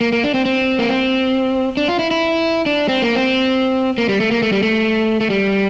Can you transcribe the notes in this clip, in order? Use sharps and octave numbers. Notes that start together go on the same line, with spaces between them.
A#3
A#3
D4
C4
C4
A#3
C4
D4
F4
E4
E4
D4
C4
A#3
C4
A#3
G3
A3
A#3
A3
G3
A3
A3
G3